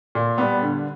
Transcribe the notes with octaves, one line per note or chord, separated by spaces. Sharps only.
A#2
G3 B3
D3